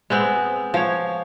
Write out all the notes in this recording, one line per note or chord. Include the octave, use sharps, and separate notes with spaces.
G#3 B3 C4
F3 C#5